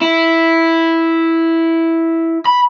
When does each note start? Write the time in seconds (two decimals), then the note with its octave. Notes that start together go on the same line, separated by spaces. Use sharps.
0.02 E4
2.45 B5